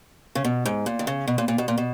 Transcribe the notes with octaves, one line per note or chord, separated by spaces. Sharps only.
C#3
B2
G#2
A#2
D#3
C#3
B2
A#2
A#2
B2
A#2
B2